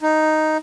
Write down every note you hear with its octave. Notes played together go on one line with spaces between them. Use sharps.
D#4